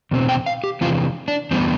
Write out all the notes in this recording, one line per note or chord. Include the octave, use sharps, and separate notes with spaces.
E2 B2 C4
G5
F5
G4
E2 C3 E3 F4
D4
E2 D3 G3 B3 C4